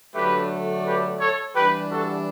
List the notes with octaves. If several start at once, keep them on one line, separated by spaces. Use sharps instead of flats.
D3 F#3 A3 D4 G4 B4
G4 B4
A4 C#5
E3 G3 D4 G4 B4
F#4 A4